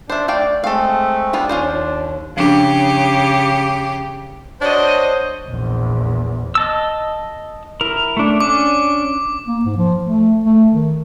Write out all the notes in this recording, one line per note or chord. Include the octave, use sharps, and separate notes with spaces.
D4 C5 E5
A3 D5 F5 G5
G#3 A3 C4 A4 F5
G3 B3 D4 F4
D#2 C#4 F4 C5
C#3 F3 D4 G4
D4 F#4 C5 C#5 D#5
A#1 E2
D#5 A5 E6
E4 A#4
A3 D4
C#4 D4 D6
A#3
G#2
F3
A3
A3
D#3